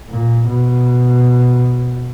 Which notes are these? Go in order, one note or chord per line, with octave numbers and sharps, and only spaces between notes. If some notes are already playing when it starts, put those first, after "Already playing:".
A#2
B2